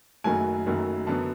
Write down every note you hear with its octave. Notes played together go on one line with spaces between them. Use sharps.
F#1 F#2 D#3 F#3 A3 G#5
F#1 F#2 D#3 F#3 A3
F#2 D3 F#3 B3 A5